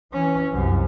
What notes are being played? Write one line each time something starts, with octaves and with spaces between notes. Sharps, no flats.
E3 C#4
C2 F#2